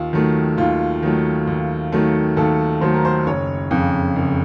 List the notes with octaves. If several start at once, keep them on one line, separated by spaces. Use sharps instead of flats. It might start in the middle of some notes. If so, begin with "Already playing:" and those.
Already playing: D#2 F4
D#3 F#3 A3
D#2 F4
D#3 F#3 A3
D#2
D#3 F#3 A3
D#2 A4
D#3 F#3 A3 C5
A#4
C5
F#1 C#5
F2 C#3
F#1